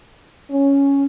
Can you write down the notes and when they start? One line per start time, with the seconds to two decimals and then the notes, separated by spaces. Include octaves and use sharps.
0.51 C#4